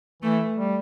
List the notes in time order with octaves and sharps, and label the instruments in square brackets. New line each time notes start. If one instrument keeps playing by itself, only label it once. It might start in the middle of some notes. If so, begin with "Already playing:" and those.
[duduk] E3 [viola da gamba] A3
[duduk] G3